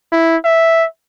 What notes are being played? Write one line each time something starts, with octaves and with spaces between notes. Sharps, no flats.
E4
E5